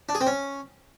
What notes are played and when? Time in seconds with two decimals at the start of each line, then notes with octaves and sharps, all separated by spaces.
0.09 D4
0.15 G#4
0.21 C4
0.27 C#4